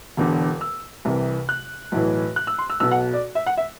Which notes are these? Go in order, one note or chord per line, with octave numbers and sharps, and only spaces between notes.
E1 E2 D3
E6
C2 C3 E3
F#6
B1 A2 E3
F#6
E6
C6
E6
B1 B2 E6
F#5
D5
E5
F#5
E5